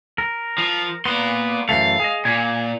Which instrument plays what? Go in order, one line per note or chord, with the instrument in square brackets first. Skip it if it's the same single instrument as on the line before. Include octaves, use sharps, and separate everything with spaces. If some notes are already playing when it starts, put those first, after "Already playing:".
[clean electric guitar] A#4
[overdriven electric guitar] F3
[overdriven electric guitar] A#3 C6 [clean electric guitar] B3
[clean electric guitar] F#2 E3 A3 [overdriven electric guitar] F5
[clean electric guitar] G#4 D#5
[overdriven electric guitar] A#2 [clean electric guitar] G#5